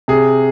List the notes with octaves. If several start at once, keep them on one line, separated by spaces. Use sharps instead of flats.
C3 G#4